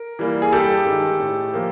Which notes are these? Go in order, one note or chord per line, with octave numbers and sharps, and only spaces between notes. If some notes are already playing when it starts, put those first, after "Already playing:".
Already playing: A#4
E3 G3 A#3
G#4
G2 G4 A4
D#3 G#3
A2
F3 A#3